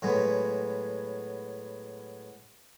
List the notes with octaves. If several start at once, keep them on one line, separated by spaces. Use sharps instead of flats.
A2 F#3 G#3 B3